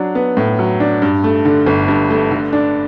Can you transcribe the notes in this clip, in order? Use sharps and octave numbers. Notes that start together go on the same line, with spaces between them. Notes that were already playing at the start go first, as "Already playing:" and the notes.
Already playing: F#3 D4
B3
A2
F#3
D4
G2
A3
D3
G1
G2
A3
D3
D4